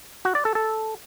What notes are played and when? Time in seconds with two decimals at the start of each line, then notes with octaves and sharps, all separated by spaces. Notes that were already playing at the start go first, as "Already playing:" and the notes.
0.25 F#4
0.35 D5
0.45 A4
0.55 A4